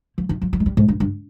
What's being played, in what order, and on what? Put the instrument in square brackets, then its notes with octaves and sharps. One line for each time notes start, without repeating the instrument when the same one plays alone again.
[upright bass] F3
D#3
F3
G3
G#3
G3
G#2
G2
G2